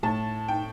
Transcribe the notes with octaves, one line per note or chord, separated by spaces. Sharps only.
A2 A5
G5